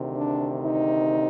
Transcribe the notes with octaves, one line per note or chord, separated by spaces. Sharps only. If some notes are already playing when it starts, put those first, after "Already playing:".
Already playing: D2 C3 D#3
D4
D#4